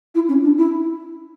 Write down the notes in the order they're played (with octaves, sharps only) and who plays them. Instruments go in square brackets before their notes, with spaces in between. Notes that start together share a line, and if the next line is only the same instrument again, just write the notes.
[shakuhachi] E4
C#4
D4
E4